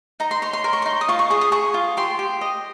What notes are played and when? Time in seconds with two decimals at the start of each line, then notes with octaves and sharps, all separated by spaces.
0.20 D#4 A#5
0.31 C6
0.42 C#5 C6
0.53 C6
0.64 A#4 C6
0.73 C#6
0.82 D#4 C6
1.01 D#6
1.08 F4 C#6
1.19 C#6
1.30 G#4 D#6
1.41 D#6
1.52 G#4 C#6
1.74 F4
1.97 G4 C6
2.19 G4
2.41 D#5